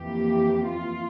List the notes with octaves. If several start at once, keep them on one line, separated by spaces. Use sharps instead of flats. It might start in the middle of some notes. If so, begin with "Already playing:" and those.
Already playing: F2 E3 A#3 G4
F4